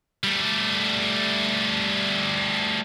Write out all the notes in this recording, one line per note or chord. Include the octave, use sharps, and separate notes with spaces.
G3 A3